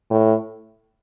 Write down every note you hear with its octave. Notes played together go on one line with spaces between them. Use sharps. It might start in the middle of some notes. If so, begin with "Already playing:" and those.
A2